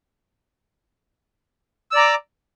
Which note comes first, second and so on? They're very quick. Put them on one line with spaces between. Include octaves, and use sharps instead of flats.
E6 D5 A#5 D6